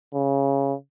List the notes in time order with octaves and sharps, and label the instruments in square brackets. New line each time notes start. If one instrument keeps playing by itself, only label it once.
[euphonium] C#3